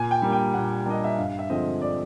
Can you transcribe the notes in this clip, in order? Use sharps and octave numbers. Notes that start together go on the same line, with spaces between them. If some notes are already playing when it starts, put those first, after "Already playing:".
Already playing: A#2 G#5
G5
G3 A#3 D4
G5
A#2 F#5
G3 A#3 D4 D#5
E5
G2 F5
E5
D3 F3 G#3 C4 D#5
D5